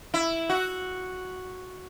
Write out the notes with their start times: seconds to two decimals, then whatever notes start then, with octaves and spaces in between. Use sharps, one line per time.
0.14 E4
0.49 F#4